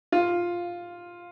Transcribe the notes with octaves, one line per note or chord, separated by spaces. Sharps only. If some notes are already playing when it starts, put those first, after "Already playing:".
F4